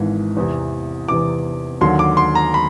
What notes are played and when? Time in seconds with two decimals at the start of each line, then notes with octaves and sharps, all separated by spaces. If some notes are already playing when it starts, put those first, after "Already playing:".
Already playing: G#1 G#2 E3
0.37 E2 C3 E3
1.08 E2 C3 E3 D6
1.81 D#2 D3 F#3 C6
1.99 D6
2.17 C6
2.35 A#5
2.54 B5